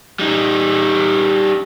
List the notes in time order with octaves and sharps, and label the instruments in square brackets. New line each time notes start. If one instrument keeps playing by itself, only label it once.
[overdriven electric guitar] G3 D#4